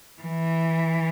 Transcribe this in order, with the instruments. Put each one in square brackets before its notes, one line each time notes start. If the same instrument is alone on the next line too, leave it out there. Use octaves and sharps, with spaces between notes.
[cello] E3